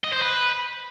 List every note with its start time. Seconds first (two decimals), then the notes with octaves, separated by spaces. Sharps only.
0.04 D#5
0.13 C5
0.22 B4